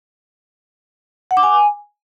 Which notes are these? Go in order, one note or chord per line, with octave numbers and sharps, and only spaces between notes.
F#5
D6
G#5